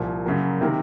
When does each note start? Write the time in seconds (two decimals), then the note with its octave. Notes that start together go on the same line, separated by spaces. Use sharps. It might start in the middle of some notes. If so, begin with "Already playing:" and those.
Already playing: C2 A#2 F3
0.25 F#2 C#3 F#3 A#3
0.61 C3 D#3 A#3